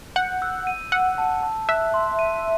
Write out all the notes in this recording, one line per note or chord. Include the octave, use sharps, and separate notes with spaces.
F#5 G6
E6
D#7
F#5 E6
A5
A5
E5 F#6
C6
D#7